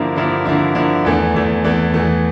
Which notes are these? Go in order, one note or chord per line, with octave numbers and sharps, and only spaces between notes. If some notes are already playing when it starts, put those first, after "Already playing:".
Already playing: G2 D3 F3 A#3 E4
G2 D3 F3 A#3 E4
G2 D3 F3 A#3 E4
G2 D3 F3 A#3 E4
E2 E3 A3
E2 E3 A3
E2 E3 A3
E2 E3 A3